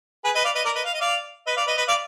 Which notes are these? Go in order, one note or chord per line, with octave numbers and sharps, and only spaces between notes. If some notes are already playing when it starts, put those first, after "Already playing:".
G#4 B4
B4 D#5
D5 F5
B4 D#5
A#4 D5
B4 D#5
F5
D#5
D5 F5
B4 D#5
D5 F5
B4 D#5
B4 D#5
D5 F5